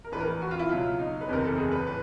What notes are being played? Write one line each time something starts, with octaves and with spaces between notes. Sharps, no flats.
A#4
A#1 A2 E3 B4
A#4
B4
F#4
F4
E4
C#2 B2 F#3 F4
D#4
B4
F#1 E2 C3 E3 A#4
A4
G#4
B4
A2 B4